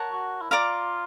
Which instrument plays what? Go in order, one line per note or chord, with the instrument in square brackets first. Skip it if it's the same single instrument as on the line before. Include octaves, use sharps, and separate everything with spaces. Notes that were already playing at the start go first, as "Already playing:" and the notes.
Already playing: [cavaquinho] A#4 C#5 F#5 A5
[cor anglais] F#4
E4
[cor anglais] F4 [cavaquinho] D5 F5 A#5 D6